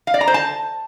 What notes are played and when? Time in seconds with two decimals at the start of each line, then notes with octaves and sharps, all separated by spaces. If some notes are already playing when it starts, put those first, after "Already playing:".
0.07 F5
0.14 D5
0.21 A#5
0.28 C5
0.34 A5